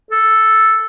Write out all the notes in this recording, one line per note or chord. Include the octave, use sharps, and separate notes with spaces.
A4